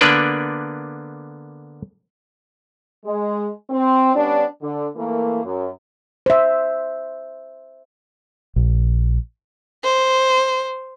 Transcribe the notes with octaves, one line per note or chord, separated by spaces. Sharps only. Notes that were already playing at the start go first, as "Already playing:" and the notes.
D3 A#3 B3 D4 B4 D5
G#3
C4
G3 B3 C#4 D4
D3
E3 A3 A#3
F#2
C5 E5
A#1
C5